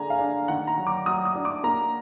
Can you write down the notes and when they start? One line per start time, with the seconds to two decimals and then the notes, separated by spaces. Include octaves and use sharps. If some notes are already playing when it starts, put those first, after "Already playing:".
Already playing: D3 G#3 D4 G#5 A#5
0.10 F5
0.19 D4
0.48 D#3 F#5
0.67 A#5
0.77 F#3
0.87 D6
1.06 F#3 D#6
1.25 D#6
1.35 D4
1.45 D6
1.64 A#3 A#5